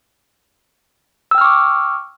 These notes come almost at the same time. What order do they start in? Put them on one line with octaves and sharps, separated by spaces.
E6 G5 F6 C#6 D6